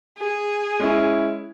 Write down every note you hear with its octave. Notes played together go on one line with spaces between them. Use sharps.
G#4
G#3 C#4 E4